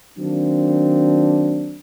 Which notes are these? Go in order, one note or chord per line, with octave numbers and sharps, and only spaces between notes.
D#3 F#3 A#3 C4 D4